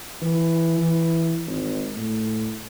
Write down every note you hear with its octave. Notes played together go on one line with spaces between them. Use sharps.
E3
E3
G#1
A2